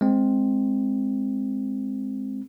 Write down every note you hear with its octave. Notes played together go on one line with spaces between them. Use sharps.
G#3 C4